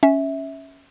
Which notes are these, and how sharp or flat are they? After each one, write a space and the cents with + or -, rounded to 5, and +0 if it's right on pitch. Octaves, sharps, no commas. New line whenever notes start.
C#4 +0 E5 -15